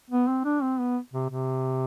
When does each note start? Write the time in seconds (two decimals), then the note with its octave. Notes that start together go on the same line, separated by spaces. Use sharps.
0.10 B3
0.28 C4
0.45 D4
0.62 C4
0.79 B3
1.13 C3
1.30 C3